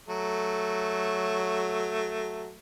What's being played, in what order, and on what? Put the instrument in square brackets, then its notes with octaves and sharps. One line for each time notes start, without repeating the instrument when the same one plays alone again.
[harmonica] F#3 A3